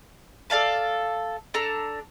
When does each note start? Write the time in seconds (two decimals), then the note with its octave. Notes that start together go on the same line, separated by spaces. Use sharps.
0.50 A4 D5 F5 A5
1.54 D4 A4 A#5